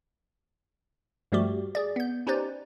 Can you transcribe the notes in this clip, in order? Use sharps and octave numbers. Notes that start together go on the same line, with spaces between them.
G2 F3 G3 A3 F#4 G4
G#4 D5
B3 G6
C#4 D#4 G4 B4 C5 D5